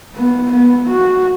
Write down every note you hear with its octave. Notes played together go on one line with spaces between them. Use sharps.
B3
B3
F#4